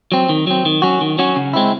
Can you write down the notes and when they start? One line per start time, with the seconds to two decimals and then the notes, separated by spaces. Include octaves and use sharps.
0.12 F#3 C4
0.29 D#3
0.47 F#3 C4
0.65 D#3
0.82 F#3 C#4 F#4
1.01 D#3
1.18 F#3 C#4 F#4
1.36 C#3
1.53 G#3 C4 E4